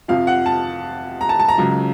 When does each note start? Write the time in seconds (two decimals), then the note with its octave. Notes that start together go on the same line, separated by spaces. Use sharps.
0.08 F2 C3 F3 F5
0.27 F#5
0.46 A5
1.21 A#5
1.29 A5
1.40 A5
1.48 A#5
1.58 C#2 C#3 F#3